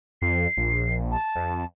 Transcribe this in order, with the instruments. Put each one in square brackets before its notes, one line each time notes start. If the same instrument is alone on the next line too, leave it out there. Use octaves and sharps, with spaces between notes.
[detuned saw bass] F2 [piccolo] C7
[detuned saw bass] A#1
[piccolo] A5
[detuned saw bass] F2